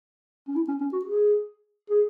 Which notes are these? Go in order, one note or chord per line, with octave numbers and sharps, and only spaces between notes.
C#4
E4
C#4
C#4
F#4
G#4
G#4